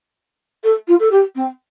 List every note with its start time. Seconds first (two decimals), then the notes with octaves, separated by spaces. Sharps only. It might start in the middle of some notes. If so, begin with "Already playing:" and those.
0.63 A4
0.88 F4
0.99 A4
1.11 G4
1.35 C4